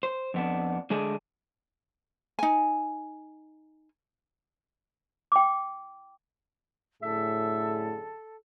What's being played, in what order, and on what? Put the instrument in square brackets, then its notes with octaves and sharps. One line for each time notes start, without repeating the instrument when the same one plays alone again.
[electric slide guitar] C5
F2 B3 D4
D3 G#3 A3 D4 G#4 D5
[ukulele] D#4 G#5
[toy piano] G5 D6
[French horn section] F#2 D3 G#4 [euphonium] A2 [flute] A4 [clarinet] E5